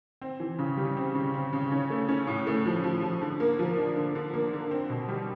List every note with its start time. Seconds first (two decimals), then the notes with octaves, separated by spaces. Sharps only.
0.21 C4
0.40 E3
0.59 C#3
0.77 G3
0.97 C4
1.15 C#3
1.34 C4
1.53 C#3
1.72 C#4
1.90 A3
2.09 C#4
2.27 A2
2.47 A3
2.66 F3
2.84 F3
3.02 F3
3.21 D3
3.40 A#3
3.59 F3
3.77 D4
3.96 D3
4.15 D3
4.34 A#3
4.53 D3
4.71 C4
4.90 B2
5.08 G3